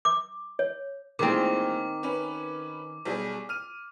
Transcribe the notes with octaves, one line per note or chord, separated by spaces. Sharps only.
D6
C#5
A#2 D#3 E3 G#3 C4 D6
C#4 B4
B1 G3 G#4
F6 D#7